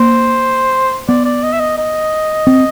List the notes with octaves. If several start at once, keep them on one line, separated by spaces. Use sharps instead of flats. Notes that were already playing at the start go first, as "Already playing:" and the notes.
Already playing: A#3 C5
B3 D5
D5
D#5
E5
D#5
D#5
C4